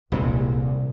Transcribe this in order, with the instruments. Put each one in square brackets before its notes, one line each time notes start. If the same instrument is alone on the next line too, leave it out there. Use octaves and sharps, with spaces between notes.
[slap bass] D#1 A#2 G#3 [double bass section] C2